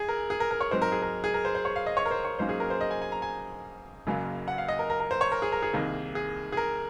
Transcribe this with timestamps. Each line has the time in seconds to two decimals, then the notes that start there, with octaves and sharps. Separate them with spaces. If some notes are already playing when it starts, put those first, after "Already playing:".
Already playing: F#2 G#4
0.08 A#4
0.30 G#4
0.40 A#4
0.51 A#4
0.61 C#5
0.71 G#2 F#3 C4 C5
0.82 A#4
0.92 G#4
1.02 A#4
1.24 G#4
1.34 A#4
1.45 C5
1.55 C5
1.65 C#5
1.76 F5
1.86 D#5
1.97 C#5
2.06 A#4
2.11 C5
2.25 C#5
2.39 G#2 F#3 A#3 C#4 C5
2.49 G#4
2.60 A#4
2.70 C5
2.81 D#5
2.91 G#5
3.02 G#5
3.12 A#5
3.22 G#5
4.07 F#1 F#2 C#3 F#3 A#3
4.48 F#5
4.58 F5
4.68 D#5
4.79 A#4
4.90 A#4
5.00 A#4
5.11 C5
5.21 C#5
5.32 A#4
5.42 G#4
5.52 A#4
5.62 G#4
5.73 C2 C3 D#3 A#3
6.15 G#4
6.52 G#4
6.57 A#4